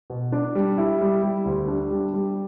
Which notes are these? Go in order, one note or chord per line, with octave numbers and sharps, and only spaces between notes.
B2
D4
G3
E4
G3
G3
D2
D4
G3
G3